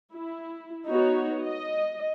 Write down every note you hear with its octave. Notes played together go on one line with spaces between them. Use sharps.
E4
B3 D#4 F#4 C#5
D#5